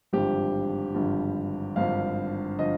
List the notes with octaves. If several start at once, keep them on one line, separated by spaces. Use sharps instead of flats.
G#1 G2 D3 F3 G4
G#1 G2 D3 F3
G#1 G2 D3 F3 F5
D3 F3 D#5